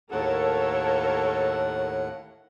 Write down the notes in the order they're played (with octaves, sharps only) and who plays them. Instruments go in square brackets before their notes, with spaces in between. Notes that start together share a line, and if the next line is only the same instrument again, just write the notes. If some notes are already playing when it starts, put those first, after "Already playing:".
[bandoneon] D#2 A2 F#5 [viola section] A4 A#4 C#5